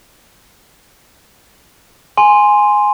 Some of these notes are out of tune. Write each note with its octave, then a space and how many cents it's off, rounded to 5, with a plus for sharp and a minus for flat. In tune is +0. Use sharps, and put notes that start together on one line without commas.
G#5 +0 C6 +0